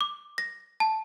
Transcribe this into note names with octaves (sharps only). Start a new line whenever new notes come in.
D6
A#6
A5